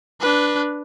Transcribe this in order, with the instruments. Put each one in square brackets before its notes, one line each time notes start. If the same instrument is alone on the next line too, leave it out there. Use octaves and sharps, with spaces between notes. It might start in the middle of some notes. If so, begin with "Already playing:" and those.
[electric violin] D4 B4